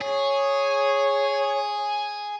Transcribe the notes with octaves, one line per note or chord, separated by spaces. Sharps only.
G#4 C#5